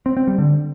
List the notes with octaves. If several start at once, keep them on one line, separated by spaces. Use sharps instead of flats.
C4
C4
G3
D3